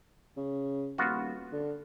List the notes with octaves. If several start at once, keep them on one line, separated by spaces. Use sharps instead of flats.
C#3
D#1 B3 F4 F#4
D3